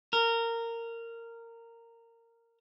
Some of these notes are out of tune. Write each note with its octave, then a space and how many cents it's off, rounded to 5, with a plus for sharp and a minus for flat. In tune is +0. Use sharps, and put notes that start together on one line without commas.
A#4 -15